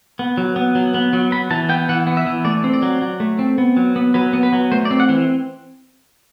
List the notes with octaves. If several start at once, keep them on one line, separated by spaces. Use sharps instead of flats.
B3
F#3
B3
F#3
B3
F#3
B3 B5
E3 A5
B3 G5
E3 F#5
B3
E5
E3
A3 D5
C4
D5
F#3
F#3
A3
C4
B3
F#3
B3
F#3 B4
B3
B4
F#3
A3 C5
D5
C4
F#5
E3